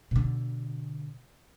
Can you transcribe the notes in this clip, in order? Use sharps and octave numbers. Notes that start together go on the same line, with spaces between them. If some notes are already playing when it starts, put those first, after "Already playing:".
B2 D3